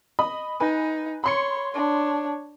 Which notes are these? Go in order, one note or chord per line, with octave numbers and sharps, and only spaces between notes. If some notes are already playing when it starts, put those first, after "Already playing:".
D#5 B5 D#6
D#4 B4 G#5
C#5 B5 C6 C#7
D4 C#5